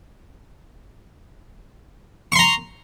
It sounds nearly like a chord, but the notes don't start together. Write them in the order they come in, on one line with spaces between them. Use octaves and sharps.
C#6 C6 A#5